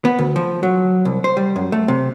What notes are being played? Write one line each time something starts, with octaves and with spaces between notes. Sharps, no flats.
B3
D2
F3
F#3
C2
C5
G3
F#2
A3
C3